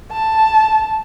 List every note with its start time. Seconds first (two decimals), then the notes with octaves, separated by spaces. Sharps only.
0.12 A5